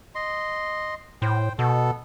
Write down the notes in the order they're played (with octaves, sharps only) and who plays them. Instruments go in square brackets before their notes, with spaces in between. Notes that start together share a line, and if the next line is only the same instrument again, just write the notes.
[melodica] D#5 C6
[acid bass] A2 [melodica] C5 G5
[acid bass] B2 [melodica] B3 A4